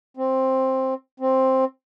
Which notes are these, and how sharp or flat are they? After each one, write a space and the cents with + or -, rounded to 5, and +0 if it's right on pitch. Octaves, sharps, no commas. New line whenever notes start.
C4 +10
C4 +10